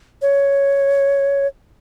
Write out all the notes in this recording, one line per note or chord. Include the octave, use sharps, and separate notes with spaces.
C#5